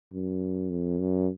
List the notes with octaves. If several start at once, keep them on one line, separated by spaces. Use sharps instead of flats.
F#2
F2
F#2